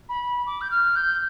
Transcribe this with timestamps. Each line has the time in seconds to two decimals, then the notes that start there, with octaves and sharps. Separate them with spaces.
0.09 B5
0.46 D6
0.61 G6
0.70 F6
0.95 G6